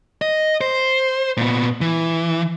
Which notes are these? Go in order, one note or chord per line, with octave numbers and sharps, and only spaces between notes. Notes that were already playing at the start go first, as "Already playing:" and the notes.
D#5
C5
A#2 B3
E3